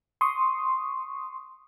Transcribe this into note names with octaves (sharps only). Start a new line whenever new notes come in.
C6 C#6 D#6